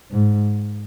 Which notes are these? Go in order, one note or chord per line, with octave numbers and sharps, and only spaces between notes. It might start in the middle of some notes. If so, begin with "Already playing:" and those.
G#2